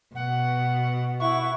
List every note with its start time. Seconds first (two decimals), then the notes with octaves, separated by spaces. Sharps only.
0.15 B2 F#5
1.20 E4 F#5 C#6